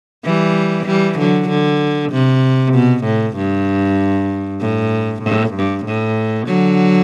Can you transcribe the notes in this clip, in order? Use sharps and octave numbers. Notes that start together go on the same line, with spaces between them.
E3 G3
E3 G3
D3 F#3
D3
C3
B2
A2
G2
A2
A2
G2
A2
D3 F#3